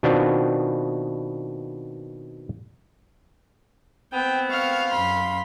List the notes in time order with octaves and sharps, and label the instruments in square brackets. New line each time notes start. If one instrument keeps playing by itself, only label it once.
[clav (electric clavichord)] B2 D#3 B3 C4 D4 F4
[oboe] B3 [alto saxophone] C4 [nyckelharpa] G5
[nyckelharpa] F5 [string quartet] C#6 F6
[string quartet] F#2 B5 C6